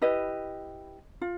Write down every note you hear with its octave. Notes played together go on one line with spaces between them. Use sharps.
E4 G4 B4 D#5
F4